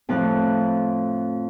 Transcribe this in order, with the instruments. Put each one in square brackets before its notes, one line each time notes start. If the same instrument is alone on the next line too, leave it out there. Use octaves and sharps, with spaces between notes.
[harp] F2 A2 F3 F5 F#6